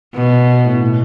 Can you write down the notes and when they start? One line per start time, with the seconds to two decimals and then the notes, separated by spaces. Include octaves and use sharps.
0.14 B2 B3
0.31 B3
0.48 B3
0.65 A2
0.82 B2